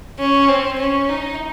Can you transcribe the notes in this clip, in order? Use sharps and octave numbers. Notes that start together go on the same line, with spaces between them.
C#4
C4
C#4
D#4